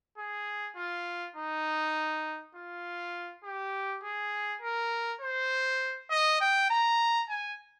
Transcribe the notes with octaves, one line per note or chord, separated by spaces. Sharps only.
G#4
F4
D#4
F4
G4
G#4
A#4
C5
D#5
G5
A#5
G#5